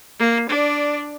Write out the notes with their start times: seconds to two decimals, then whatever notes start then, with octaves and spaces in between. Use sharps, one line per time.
0.19 A#3
0.49 D4 D5